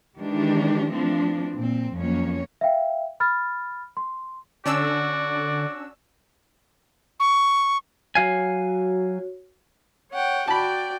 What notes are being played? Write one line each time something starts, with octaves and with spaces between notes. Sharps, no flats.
D#3 E3 G#3 D4 G4
E3 F3 A3 C4 D4
A#2 C4
F2 F#3 A#3 C#4 C#5
E5 F5 G5
B5 F6 A6
C6
D3 C#4 D4 F#4 D5 E6
C#6
F#3 F#4 C#5 F5 G#5
C#5 F#5 G5
F#4 D5 G5 A5 B5